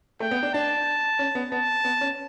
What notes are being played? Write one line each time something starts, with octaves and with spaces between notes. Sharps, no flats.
A3 G5
B3
D4
D4 A5
C#4
B3
B3 A5
B3
C#4